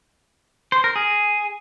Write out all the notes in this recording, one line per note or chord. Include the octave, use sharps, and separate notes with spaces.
C5
A#4
G#4